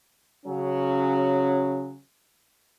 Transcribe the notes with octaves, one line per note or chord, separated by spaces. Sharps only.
C#3 F#3 C#4